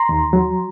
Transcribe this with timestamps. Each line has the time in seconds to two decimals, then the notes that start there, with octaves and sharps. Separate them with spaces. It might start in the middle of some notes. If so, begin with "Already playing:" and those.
Already playing: A#5 C6
0.09 D#2
0.33 F#3